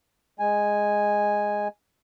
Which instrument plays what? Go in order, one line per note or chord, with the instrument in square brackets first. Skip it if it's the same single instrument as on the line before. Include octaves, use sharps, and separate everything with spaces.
[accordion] G#3 G#5